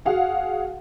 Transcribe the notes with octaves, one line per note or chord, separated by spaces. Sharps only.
F#4 G#4 F5 F#5